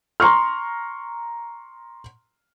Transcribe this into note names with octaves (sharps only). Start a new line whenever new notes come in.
A#5 C6 C#6 F6